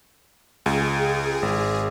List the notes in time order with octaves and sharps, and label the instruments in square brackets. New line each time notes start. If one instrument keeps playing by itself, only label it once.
[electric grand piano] C#2 [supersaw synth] G#4
[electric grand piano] G#1